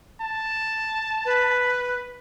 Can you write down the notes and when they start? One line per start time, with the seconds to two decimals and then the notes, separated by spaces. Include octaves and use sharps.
0.21 A5
1.25 B4